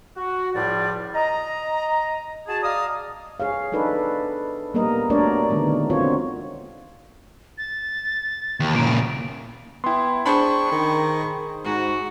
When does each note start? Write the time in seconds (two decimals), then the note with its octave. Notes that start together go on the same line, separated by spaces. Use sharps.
0.17 F#4
0.54 C#2 A2 F3 G3 F4 D5
1.14 D#5 A#5
2.47 F#4 G#4 A5
2.63 D5 D#5 F5 A#5 D#6
3.40 G#4 C#5 F5
3.72 D4 D#4 A4 B4 D5
4.74 G3 A#3 B3 A#4 D#5
5.10 A3 D4 F#4 A#4 C#5 D5
5.50 D3 D#3 G#3 B3
5.90 C4 F4 F#4 C#5
7.58 A6
8.60 D#2
8.76 A#2 C#3 D7
9.84 B3 E4 G5 C6
10.26 D4 G#4 C5 B5 C#6
10.72 D#3
11.65 G#2 F#4